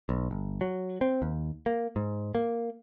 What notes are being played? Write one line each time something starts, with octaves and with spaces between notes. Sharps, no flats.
B1
G1
F#3
C4
D#2
A#3
G#2
A#3